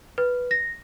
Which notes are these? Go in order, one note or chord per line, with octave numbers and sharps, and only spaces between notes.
B4
A#6